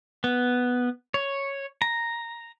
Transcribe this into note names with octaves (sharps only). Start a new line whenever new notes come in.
B3
C#5
A#5